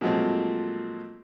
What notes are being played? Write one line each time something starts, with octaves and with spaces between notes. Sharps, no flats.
A#2 F3 F#3 G#3 A3 C4